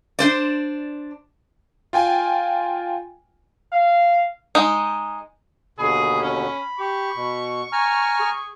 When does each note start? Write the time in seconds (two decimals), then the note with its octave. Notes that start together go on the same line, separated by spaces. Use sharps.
0.19 D4 C5 D5
1.93 F4 G5 G#5
3.72 F5
4.55 G#3 D#4
5.79 D#2 B2 D3 G#4 B5
6.22 C#4
6.79 G4 C#6
7.16 B2
7.72 G#5 A#5 F6
8.19 G#4